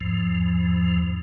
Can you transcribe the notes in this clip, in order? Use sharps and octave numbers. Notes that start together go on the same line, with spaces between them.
E2 G#2 F3